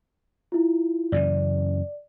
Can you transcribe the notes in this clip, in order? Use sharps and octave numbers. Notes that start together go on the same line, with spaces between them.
E4 F4
F#2 C#3 E3 D5